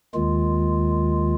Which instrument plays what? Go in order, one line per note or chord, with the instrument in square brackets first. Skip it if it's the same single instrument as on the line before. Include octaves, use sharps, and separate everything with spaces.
[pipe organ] D#2 D#3 G#3 F4